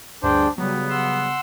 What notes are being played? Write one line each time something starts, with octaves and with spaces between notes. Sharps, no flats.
D2 G2 D4 G#4 C5 D5 G5
C#3 F#3 G3 B3 G4
F#5 C6 E6